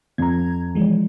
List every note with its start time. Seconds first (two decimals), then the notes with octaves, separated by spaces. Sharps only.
0.18 F2 A#5 G#6
0.75 E3 F3 G#3